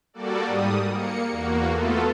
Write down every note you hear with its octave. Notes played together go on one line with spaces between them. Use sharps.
G3 A#3 F#4 A4 D5
G#2 G3 D#6
A#3 C#7
E2 A#3 F#4
A3 B3 F4 A4